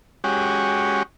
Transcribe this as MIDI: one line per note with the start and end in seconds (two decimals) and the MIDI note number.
0.24 1.03 56
0.24 1.03 61
0.24 1.03 66
0.24 1.03 67